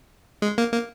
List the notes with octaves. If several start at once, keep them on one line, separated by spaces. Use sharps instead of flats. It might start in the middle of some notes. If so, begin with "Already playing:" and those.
G#3
A#3
A#3